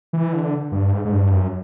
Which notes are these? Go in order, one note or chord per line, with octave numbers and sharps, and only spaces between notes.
E3
D3
G2
G#2
G#2
G2
F#2